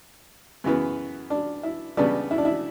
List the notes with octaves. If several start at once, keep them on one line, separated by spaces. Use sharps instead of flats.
F#2 C#3 E3 B3
D4
E4
C#2 C#3 G3 B3 D4
E4
D4
E4